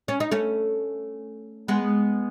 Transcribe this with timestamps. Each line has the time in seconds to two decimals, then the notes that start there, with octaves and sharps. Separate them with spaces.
0.08 C#4
0.20 D#4
0.32 A3 C#4
1.68 G#3 B3